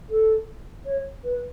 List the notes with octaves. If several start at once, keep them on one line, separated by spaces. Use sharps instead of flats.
A4
C#5
B4